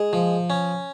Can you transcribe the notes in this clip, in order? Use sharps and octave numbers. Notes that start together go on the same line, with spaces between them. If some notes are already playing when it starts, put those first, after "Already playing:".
Already playing: G#3
F3
C#4